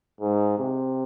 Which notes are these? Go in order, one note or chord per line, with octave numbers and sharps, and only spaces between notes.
G#2
C3